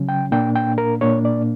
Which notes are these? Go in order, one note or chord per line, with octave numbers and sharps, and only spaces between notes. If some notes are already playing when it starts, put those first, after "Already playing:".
Already playing: C#3 F#3 C#4
G5
A#2 A#3 D4 G5
G5
A#4
A#2 A#3 D4 C#5
D5